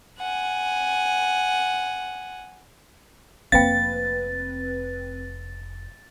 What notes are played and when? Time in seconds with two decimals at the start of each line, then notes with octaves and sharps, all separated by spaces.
0.19 F#5 G#5
3.52 F1 A#3 C4 B4 F5 G5 A6